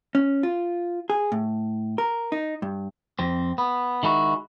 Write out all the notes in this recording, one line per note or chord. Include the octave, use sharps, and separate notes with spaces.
C#4
F4
G#4
A2
A#4
D#4
G2
F2 C4
B3
D#3 G#3 E4 F#4